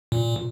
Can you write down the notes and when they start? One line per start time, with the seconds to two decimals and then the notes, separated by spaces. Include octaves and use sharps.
0.12 A#2